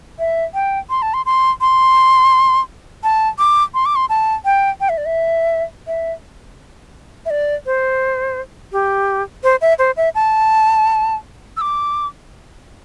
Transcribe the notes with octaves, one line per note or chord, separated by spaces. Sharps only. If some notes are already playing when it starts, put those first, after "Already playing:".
E5
G5
C6
A5
C6
C6
C6
A5
D6
C6
D6
C6
A5
G5
G5
E5
D5
E5
E5
E5
D5
C5
G4
C5
E5
C5
E5
A5
E6
D6